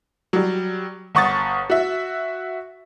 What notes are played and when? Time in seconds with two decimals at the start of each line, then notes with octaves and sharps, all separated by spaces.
0.33 F#3 G3
1.15 G1 F#5 C#6 D#6 A6
1.70 F#4 E5